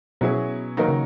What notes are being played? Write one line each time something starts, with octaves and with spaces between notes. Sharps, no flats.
B2 F#3 C#4 E4 G#4
D#3 F#3 A#3 D#4 A#4
C#3